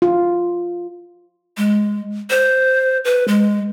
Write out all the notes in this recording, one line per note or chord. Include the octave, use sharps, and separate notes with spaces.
F4
G#3
C5
B4
G#3